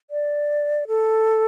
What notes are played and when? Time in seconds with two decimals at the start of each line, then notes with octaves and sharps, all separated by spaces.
0.10 D5
0.88 A4